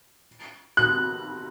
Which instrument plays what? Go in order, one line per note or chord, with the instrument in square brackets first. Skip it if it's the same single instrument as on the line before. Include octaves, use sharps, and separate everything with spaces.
[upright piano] F#6